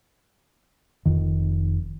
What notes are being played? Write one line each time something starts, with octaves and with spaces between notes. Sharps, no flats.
F1 F2 D#3